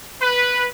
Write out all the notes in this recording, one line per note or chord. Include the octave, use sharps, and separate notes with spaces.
B4